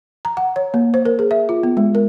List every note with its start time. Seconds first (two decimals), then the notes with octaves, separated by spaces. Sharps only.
0.25 A#5
0.37 F#5
0.56 C#5
0.74 A#3
0.94 C5
1.05 A#4
1.19 G#4
1.31 E5
1.49 F4
1.63 B3
1.77 G#3
1.95 A#4